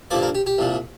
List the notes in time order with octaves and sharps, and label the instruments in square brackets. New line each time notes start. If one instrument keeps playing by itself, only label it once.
[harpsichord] G2 D3 F3 A#3 D5
A#4
G4
G4
C2 A#2 F3